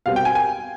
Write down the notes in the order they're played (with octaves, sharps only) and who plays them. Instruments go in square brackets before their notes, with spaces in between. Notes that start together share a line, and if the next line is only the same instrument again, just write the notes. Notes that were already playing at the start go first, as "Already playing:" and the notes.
[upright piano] B2 G3 C4 F5
G5
G#5
G#5